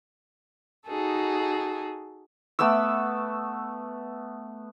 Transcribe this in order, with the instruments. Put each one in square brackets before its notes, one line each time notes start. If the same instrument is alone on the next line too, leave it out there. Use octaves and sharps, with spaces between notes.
[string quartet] D#4 F#4 G#4 A4
[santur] A3 B3 D6 E6